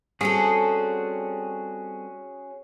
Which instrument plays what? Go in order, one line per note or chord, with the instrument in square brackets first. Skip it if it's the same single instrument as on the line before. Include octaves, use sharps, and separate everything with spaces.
[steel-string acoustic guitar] G3 C4 A4 [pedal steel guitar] C#4 F#4 G#4